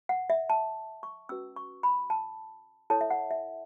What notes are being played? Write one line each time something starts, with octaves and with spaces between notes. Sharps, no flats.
F#5
E5
A5
C#6
C#4 F#4 B4 E6
C#6
B5
A5
E4 A4 C#5 A5
E5
F#5
E5